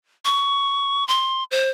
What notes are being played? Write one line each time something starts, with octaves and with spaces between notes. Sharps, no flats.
C#6
C6
C5